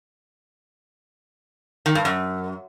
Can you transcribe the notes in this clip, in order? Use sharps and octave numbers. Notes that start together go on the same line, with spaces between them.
D#3
G2
F#2